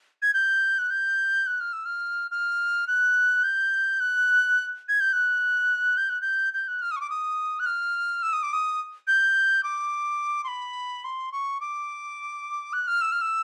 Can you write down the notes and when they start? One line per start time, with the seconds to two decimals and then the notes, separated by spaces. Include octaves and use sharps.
0.22 G#6
0.34 G6
0.79 F#6
0.90 G6
1.47 F#6
1.61 F6
1.73 E6
1.85 F6
2.31 F6
2.87 F#6
3.43 G6
4.00 F#6
4.89 G#6
5.00 G6
5.13 F#6
5.97 G6
6.09 F#6
6.21 G6
6.54 G6
6.68 F#6
6.82 F6
6.91 D#6
6.96 C#6
7.01 D6
7.10 D#6
7.60 F#6
7.66 F6
8.23 E6
8.33 D#6
8.43 D6
8.53 D#6
9.07 G6
9.63 D6
10.44 C6
10.48 B5
11.04 C6
11.32 C#6
11.61 D6
12.73 F#6
12.87 F6
13.01 E6
13.12 F6
13.21 E6